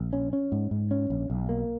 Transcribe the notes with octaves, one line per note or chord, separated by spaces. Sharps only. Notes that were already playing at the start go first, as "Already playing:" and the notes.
Already playing: A#1
C#4
C#4
G#2
G#2
C#4
A#1
B1
A#3